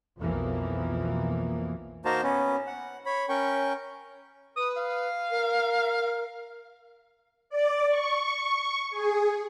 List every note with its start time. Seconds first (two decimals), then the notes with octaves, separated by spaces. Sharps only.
0.18 B1 F2 B2 E3 F3 A#3
2.05 A#3 D#4 F#4 C5 A5 A#5
2.23 B3 C#4
2.67 F#5
3.06 C#5 B5
3.29 C#4 A#4 G5 C#6
4.57 B4 D#6
4.77 F5
5.31 A#4
7.50 D5
7.89 C#6
8.91 G#4